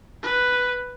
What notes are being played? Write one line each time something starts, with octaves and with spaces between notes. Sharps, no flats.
B4